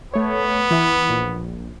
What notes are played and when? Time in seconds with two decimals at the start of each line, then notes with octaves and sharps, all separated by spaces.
0.14 A3 B3 C#5
0.70 E3 E4
1.09 A#1